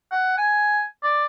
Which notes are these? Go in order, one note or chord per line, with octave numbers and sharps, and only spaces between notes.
F#5
G#5
D5